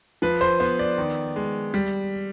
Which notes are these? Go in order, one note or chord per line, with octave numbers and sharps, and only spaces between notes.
F3 B4
C5
B3 C5
D5
D#3
G#3
G3